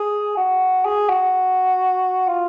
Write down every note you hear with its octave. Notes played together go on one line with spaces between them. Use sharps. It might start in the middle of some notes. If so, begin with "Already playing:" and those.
Already playing: G#4
F#4
G#4
F#4
F4